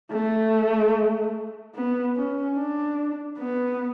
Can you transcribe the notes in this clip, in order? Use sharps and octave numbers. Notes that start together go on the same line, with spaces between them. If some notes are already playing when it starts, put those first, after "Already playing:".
A3
B3
C#4
D4
B3